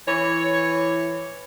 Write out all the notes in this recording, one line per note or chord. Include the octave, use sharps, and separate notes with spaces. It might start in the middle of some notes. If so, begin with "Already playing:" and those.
E3 C#5